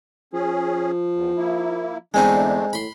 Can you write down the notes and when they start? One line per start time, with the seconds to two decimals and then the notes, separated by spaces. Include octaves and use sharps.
0.33 F3 C#4 G#4
1.14 E2
1.37 A#3 E4
2.14 E2 D3 G#3 A3 C4 D4 D#4
2.73 A2 B5 C6